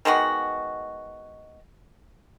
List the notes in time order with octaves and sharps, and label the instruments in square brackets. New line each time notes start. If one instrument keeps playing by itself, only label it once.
[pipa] D#3 G#3 B3 F#4